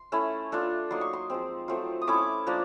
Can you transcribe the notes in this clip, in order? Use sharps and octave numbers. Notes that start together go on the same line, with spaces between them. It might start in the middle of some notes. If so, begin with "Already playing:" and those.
Already playing: C6
A3 C#4 E4
A3 D4 F4
F#3 A#3 D#4 C6
C#6
C6
F3 G#3 C4
F#3 A3 C4 F4
D#6
A3 C#4 E4 D6
F3 A#3 D4